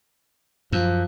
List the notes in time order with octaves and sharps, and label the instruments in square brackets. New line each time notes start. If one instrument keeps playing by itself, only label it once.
[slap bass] F#2 [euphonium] F3